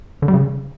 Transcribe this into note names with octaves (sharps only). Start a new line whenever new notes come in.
D3
G3
C#3